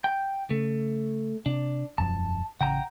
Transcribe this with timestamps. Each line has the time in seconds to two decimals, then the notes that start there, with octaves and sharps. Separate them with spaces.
0.04 G5
0.50 C#3 A3
1.46 C3 D4
1.98 E1 F#2 F3 A5
2.61 A1 C#3 F#5 G5 A#5